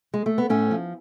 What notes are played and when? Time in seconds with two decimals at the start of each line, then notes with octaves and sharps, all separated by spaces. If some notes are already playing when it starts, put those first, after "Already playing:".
0.14 G#3
0.26 A3
0.38 B3
0.49 A2 A3 C#4
0.71 F3